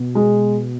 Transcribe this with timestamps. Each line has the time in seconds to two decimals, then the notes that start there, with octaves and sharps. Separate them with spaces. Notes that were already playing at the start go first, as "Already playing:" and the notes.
Already playing: B2
0.15 G#3